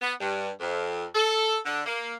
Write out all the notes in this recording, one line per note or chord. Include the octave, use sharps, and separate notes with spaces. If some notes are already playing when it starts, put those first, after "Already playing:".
B3
G2
F2
A4
D3
A#3